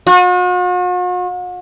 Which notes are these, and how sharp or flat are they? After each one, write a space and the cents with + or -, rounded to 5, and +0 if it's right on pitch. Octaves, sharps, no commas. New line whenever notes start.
F#4 -45